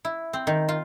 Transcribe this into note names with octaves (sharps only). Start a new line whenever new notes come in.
E4
C4
D#3
F4